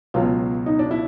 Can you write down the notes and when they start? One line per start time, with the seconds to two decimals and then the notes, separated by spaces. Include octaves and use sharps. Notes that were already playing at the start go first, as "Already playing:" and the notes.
0.14 C#2 B2 F#3 F4
0.66 D#4
0.79 D4
0.91 E4